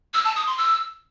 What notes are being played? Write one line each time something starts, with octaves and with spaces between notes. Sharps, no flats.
E6
A5
D#6
C6
E6